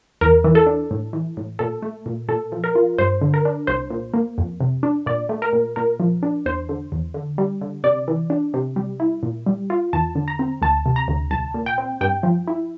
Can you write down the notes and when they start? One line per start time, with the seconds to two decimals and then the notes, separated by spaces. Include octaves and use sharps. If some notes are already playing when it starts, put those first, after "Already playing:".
0.21 E2 A#4
0.44 E3
0.55 A4
0.67 D4
0.91 A2
1.13 E3
1.37 A2
1.59 A#2 A4
1.82 A3
2.06 A#2
2.28 A#2 A4
2.52 F3
2.64 A#4
2.75 F4
2.98 G2 C5
3.22 D3
3.34 A#4
3.45 D4
3.67 C2 C5
3.90 A#2
4.14 A#3
4.38 F2
4.60 C3
4.83 D4
5.06 A#2 D5
5.29 A3
5.42 A#4
5.53 A#2
5.76 A#2 A#4
6.00 F3
6.23 D4
6.46 E2 C5
6.69 D3
6.92 E2
7.14 D3
7.38 G3
7.61 D3
7.84 C3 D5
8.08 E3
8.30 D4
8.54 C3
8.76 G3
9.00 E4
9.23 A#2
9.46 G3
9.70 F4
9.93 E2 A5
10.15 D3
10.28 A#5
10.39 C4
10.62 D2 A5
10.86 C3
10.96 A#5
11.08 D2
11.31 C2 A5
11.54 A#2
11.66 G5
11.78 C4
12.01 G2 G5
12.23 F3
12.48 E4